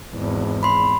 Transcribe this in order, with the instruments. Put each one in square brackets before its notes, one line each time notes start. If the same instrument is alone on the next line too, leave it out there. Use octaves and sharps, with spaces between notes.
[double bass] G#1 E2
[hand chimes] B5 C6